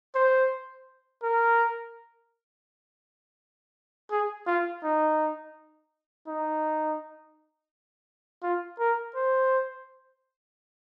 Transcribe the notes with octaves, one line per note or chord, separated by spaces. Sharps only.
C5
A#4
G#4
F4
D#4
D#4
F4
A#4
C5